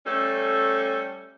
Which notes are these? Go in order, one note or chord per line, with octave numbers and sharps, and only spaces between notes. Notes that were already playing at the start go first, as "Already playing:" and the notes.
G3 A3 C#4 A4